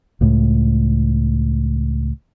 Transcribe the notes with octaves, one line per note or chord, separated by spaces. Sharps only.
C#2 A2